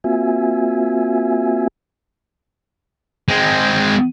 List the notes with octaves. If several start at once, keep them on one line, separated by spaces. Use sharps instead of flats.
A#3 C4 F4 F#4 E5 G#5
G#3 C4